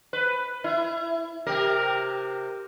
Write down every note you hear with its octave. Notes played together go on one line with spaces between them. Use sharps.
B4
E4
C3 G4 A#4